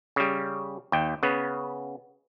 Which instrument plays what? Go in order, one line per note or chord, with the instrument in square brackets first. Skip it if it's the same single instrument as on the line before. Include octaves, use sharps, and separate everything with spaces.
[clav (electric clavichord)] C#3 G3
D#2 G5
C#3 B3